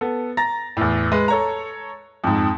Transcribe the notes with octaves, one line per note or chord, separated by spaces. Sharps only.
B3 A4
A#5 A6 A#6
E2 A2
G#3 B4
A4 C#5 A#5
F2 G#2